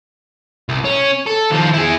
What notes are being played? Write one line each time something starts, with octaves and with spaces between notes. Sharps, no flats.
C2
C#4
A4
D#2 F3
E4 G#4